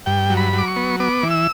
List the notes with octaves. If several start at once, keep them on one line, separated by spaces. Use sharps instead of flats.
G2 G5
F#3
B5
F#3
D6
C#6
B3
B3 D6
E3
E6